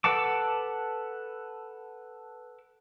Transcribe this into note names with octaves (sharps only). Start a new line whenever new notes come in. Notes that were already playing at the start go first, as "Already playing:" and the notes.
A4 B4 F#5 A5 D6